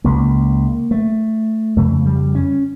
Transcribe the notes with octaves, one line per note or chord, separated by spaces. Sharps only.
C#2 C#3 A#3
A3
F2 C#3 A3
G3
C#4